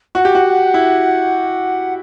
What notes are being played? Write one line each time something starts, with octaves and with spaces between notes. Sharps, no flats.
F#4 F#5
G4
F#4
E4